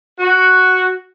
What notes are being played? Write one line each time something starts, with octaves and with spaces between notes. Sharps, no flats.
F#4